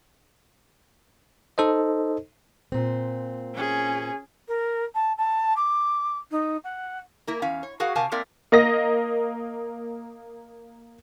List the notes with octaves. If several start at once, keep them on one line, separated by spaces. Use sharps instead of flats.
D#4 A4 C5 D#5
A#2 C4
C#4 G#4
A#4
A5
A5
D6
D#4
F#5
A#3 E4 A#4
E2 C#4 F5
C#5
F#4 G#4 A#4 F5 F#5
C3 A#4 F5 G#5 A5
A#3 C4 A#4 D5 E5
A#3 D#5 A#6